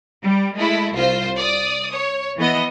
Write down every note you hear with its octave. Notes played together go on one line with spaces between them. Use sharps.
G3
G#3 A3 E4
C2 F4 C5
D5 D#6
C#5
E3 B3 D#5